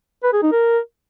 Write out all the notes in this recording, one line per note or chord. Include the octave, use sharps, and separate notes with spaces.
B4
G#4
D#4
A#4